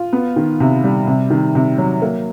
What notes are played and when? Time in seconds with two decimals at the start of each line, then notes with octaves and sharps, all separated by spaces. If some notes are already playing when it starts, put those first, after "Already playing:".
Already playing: F4
0.13 B3
0.36 D#3
0.60 C3
0.84 G3
1.07 C3
1.30 D#3
1.55 C3
1.78 F#3
2.02 A#3